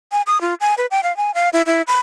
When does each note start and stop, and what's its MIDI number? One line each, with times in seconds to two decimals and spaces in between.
0.12 0.22 80
0.27 0.41 87
0.41 0.54 65
0.60 0.74 80
0.78 0.86 71
0.91 1.00 79
1.03 1.15 77
1.17 1.31 80
1.35 1.49 77
1.53 1.62 64
1.66 1.82 64
1.87 2.00 83